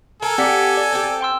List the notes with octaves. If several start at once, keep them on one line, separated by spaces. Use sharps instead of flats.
A4 A#4 G#5
C4 G4 D5 F#5 B6
D5
C4 G4
G5 C6 E6